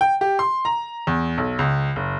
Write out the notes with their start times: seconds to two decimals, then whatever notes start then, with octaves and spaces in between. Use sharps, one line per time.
0.01 G5
0.21 G4
0.39 C6
0.65 A#5
1.07 E2
1.38 B1
1.59 C#2
1.96 F#1